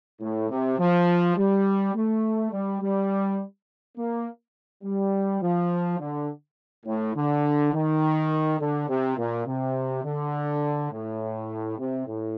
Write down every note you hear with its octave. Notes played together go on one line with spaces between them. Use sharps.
A2
C3
F3
G3
A3
G3
G3
A#3
G3
F3
D3
A2
D3
D#3
D3
C3
A#2
C3
D3
A2
C3
A2